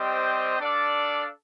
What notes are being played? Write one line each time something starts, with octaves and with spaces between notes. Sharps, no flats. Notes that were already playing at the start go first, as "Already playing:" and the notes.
Already playing: G3 C4 G4 C5 D#5
D4 A4 D5 F5